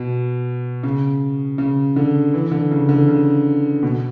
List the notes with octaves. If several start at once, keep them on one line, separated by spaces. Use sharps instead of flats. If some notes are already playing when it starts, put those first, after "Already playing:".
Already playing: B2
C#3
C#3
D3
E3
D3
C#3
D3
C#3
B2